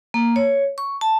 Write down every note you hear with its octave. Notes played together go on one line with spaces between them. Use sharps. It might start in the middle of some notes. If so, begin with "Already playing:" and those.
A#3
C#5
C#6
A5